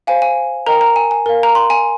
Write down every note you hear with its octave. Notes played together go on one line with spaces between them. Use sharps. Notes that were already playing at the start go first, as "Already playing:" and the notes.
C5 F5 G#5
G#5
A#4 D#5 G5 A#5
A#5
G#5
G#5
A#4 F5
A#5
C6
G#5